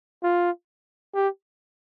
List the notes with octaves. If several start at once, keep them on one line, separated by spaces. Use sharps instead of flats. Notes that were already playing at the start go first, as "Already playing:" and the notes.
F4
G4